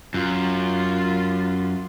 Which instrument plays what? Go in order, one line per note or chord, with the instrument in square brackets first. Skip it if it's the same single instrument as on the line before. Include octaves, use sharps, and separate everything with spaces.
[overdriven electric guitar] F#2 [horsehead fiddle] F4